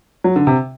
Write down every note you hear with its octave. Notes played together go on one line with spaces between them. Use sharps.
F#3
D3
C3